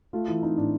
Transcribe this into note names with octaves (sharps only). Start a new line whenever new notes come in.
A3 F4
E3 E4
C4 D#4
A2 D4